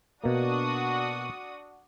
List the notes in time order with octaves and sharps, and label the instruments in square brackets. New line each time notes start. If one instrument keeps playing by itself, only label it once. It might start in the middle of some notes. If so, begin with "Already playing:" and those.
[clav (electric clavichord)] B2 A#3 [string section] D4 F#4 D#6